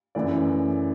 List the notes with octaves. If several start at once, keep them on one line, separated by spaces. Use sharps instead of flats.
F#2 E3 A3 D5